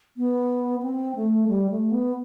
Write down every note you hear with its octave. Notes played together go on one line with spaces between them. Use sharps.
B3
C4
A3
G3
A3
B3